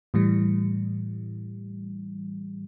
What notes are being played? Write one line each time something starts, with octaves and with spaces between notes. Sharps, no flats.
A2 E3 G3